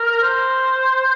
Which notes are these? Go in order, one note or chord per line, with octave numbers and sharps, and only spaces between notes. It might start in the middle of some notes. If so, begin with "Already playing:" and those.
Already playing: A#4
C5